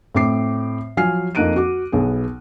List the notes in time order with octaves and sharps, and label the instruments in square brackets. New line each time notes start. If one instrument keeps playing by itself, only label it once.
[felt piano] A2 C4 D6 C7
F3 F#3 G#5 F6 C7
F2 A#3 D#4 F#6 D7 D#7
F#4 D6
B1 B3 G#4